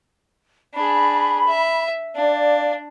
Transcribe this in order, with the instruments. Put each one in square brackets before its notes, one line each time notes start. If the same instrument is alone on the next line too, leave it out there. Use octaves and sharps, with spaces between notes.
[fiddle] D4 G#4 [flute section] B5
[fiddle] E5
[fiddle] D4 [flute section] D5 F5